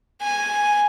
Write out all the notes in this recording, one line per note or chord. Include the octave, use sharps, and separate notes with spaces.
G#5